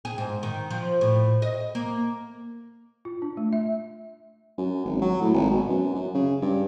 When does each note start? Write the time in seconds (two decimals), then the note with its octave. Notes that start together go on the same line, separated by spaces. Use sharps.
0.05 G#4
0.18 G#2
0.43 D#3
0.70 F3
1.01 A2
1.42 D#5
1.75 A#3
3.05 F4
3.22 D4
3.37 A3
3.53 E5
4.58 F#2
4.85 G#1
5.01 F#3
5.22 A2
5.34 G#1
5.51 B2
5.69 F#2
5.95 F#2
6.14 C#3
6.42 G2